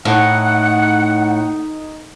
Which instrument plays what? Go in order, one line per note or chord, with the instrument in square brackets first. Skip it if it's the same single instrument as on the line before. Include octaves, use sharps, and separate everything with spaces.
[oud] A2 [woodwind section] D#4 [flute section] F#5